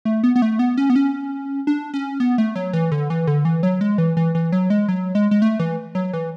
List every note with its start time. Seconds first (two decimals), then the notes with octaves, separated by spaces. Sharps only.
0.05 A3
0.24 B3
0.36 B3
0.42 A3
0.59 B3
0.78 C#4
0.90 B3
0.96 C#4
1.67 D4
1.94 C#4
2.20 B3
2.38 A3
2.55 F#3
2.73 E3
2.92 D3
3.10 E3
3.27 D3
3.45 E3
3.63 F#3
3.81 G#3
3.98 E3
4.17 E3
4.35 E3
4.52 F#3
4.70 G#3
4.88 F#3
5.15 G#3
5.31 G#3
5.42 A3
5.59 E3
5.95 F#3
6.13 E3